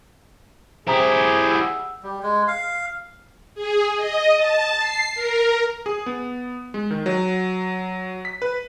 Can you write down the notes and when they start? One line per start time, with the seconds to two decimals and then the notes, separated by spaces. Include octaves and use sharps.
0.87 E4 G4 G#4 C5 A#5 D#6
1.51 F#5 E6
2.03 G3
2.23 G#3
2.48 F5
3.55 G#4
3.97 D#5
4.36 A5
4.79 C7
5.14 A#4
5.86 G#4
6.06 B3
6.74 G#3
6.91 D#3
7.06 F#3
8.25 B6
8.42 B4